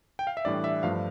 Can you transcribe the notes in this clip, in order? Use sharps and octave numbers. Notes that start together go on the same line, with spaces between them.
G5
F5
E5
A2 E3 G3 D4 D5
E5
G2 F3 A3 D4 F5